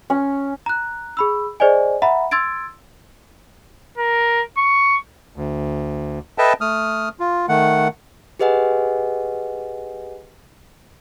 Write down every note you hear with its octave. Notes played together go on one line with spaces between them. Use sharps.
C#4
A#5 F#6
G#4 B5 E6
G#4 C5 D5 D#5 G#5
E5 F#5 A#5 B5
C6 E6 G#6 A6 D7
A#4
C#6
D2
A4 B4 D#5 E5 G5 A5
A3 D#6 F6
F4
D#3 A3 F#5
G4 G#4 B4 D#5 F#5 G#5